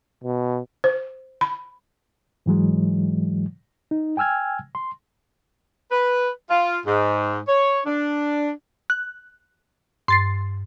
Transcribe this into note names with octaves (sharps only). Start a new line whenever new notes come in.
B2
C5
B5
G#2 E3 F#3 G#3
D#4
G5 G#5 E6 F6 G#6
C6
B4
F4
G#2
C#5
D4
F#6
G2 C6 A6 C7